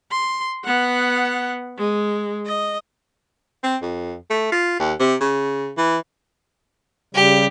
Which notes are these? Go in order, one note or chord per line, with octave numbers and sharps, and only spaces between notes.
C6
B3 F#5
G#3
D#5
C4
F2
A3
F4
D#2
C3
C#3
E3
C#3 G3 G4